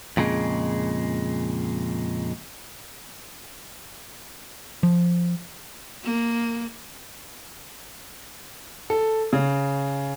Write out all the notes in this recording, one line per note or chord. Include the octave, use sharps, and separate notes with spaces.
F2 A#2 C#3 G#3
F3
A#3
A4
C#3